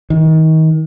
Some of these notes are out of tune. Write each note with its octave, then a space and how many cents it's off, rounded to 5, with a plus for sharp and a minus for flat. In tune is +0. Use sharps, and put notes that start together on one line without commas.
D#3 +30